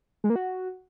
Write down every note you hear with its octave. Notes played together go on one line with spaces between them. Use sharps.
G#3
A#3
F#4